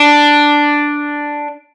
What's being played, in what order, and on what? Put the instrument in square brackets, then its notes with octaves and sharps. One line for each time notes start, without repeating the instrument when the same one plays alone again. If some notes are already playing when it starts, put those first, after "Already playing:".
Already playing: [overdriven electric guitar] D4